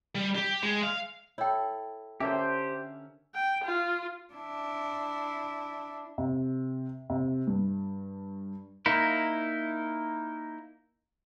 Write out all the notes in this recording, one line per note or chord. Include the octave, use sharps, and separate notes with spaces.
G3
G4
G#3
F5
E4 A4 C#5 G5
D3 C#4 G4 A4 A#4 C5 E5
G5
F4
D4 E4
C3
C3
G2
A#3 D#4 E4